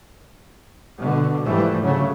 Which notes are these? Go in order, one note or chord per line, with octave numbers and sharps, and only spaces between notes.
B2 D3
G#2 E3 F3 G3 A3
D2 C#3 F#3 A3